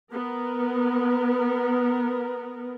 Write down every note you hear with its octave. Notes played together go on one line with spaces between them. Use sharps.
B3 A#4